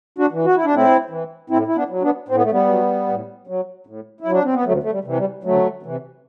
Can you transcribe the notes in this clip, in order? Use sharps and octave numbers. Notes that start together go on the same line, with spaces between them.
D4 F#4
E3
F#4
E4
D4
A2 C4 E4
E3
A2 C4 E4
E4
B3 D4
F#3
B3 D4
A2 C4
B3
A3
G3 B3
F#3
A2
F#3
A2
E4
F#3
D4
C4
B3
D2 F#3 A3
A3
G3
C3 E3
G3
D2 F#3 A3
C3 E3